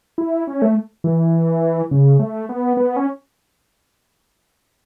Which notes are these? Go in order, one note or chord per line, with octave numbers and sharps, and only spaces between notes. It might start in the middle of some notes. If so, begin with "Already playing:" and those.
E4
C#4
A3
E3
C#3
A3
B3
B3
C#4